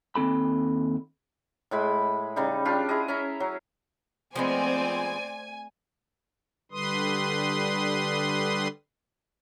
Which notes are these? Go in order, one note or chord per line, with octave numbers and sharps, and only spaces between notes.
D#2 C4 A4 B5
A2 G#3 B5
C#3 G3 D#4
D4 F4 G4
E4 G#4 D#5
C#4 E5 A#5
F#3
F3 G#3 A3 B3 C4 C5 D5 G#5
D3 G3 B4 C6 D#6